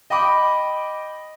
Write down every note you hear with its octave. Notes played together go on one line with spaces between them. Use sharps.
D#5 G5 B5 D6